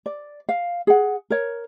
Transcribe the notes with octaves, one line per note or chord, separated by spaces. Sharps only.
D5
F5
G#4 F#5
A#4 C#5